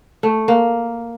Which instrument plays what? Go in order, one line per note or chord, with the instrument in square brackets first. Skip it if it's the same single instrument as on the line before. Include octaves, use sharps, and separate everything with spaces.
[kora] A3
A#3